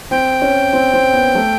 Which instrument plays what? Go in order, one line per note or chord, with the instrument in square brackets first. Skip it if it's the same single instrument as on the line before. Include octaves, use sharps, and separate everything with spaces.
[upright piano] C4 [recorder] G5
[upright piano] C#4
C4
C4
B3
A3